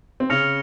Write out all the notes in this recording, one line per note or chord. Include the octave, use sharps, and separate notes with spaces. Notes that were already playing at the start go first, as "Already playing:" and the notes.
C4
C#3 C#4 F6 A#6 C#7 F7